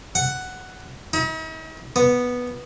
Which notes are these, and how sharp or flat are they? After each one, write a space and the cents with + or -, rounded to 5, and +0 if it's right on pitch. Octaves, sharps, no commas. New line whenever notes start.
F#5 +5
D#4 +45
B3 -5